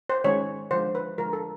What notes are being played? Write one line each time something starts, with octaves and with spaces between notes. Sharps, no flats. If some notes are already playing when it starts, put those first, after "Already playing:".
C5
D#3 G#3 C#4 C#5
D3 F3 G#3 C5
B4
D3 F3 G#3 A#4
A4